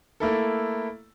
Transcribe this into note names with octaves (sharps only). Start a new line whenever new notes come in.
A3 A#3 E4 A4